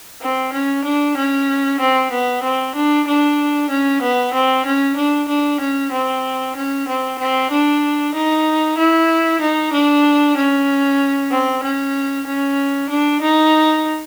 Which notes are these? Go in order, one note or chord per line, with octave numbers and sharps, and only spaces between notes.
C4
C#4
D4
C#4
C4
B3
C4
D4
D4
C#4
B3
C4
C#4
D4
D4
C#4
C4
C#4
C4
C4
D4
D#4
E4
D#4
D4
C#4
C4
C#4
C#4
D4
D#4